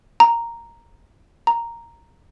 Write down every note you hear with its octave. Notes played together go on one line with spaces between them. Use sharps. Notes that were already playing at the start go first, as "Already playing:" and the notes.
A#5
A#5